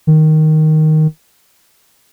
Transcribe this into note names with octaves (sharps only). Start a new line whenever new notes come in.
D#3